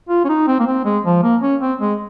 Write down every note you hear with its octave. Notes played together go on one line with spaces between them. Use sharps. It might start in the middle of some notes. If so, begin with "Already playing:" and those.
F4
C#4
D#4
C4
A#3
C4
G#3
F3
A#3
C#4
C4
G#3